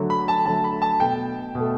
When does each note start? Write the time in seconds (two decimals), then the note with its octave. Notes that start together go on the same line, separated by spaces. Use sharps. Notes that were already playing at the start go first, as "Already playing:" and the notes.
Already playing: D3 F#3 A3
0.10 B5
0.28 A5
0.45 D3 F#3 A3 A5
0.64 B5
0.82 A5
1.00 B2 A3 G5
1.55 B2 A3